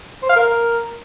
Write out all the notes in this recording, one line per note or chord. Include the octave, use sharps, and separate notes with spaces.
C5
F5
A#4